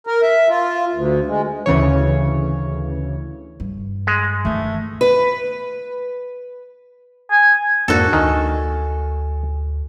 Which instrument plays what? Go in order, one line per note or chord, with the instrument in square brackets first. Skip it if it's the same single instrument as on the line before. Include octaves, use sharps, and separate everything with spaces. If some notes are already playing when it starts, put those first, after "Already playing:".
[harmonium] A#4
E5
F4
D2
G#3
[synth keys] D2 C#3 E3 C#5
[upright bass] G2
[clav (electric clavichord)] G#3
[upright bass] D#3 E3 [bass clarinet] A3
[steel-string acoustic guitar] B4
[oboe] G#5
[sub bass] F2 [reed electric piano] G#2 A#3 D4 [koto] F#4 A4
[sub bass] D2 [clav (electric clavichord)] D#3 [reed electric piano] G#5